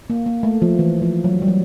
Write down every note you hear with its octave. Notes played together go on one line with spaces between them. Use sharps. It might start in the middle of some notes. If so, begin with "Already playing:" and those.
A#3
A#3
A3
F3
E3
F3
F#3
G3
F#3